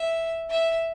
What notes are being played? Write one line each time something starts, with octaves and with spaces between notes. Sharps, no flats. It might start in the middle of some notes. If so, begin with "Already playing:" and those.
Already playing: E5
E5